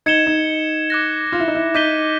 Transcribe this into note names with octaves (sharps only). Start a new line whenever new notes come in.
D#4 G#6 C#7 E7 G7
D#4
D6 F#6 A#6
F4
E4
D#4
E4
D#4 D6 G6 B6 D#7 G7